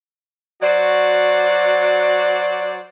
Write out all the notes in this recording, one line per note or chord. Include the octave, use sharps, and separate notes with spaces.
F#3 F#4 C5 D5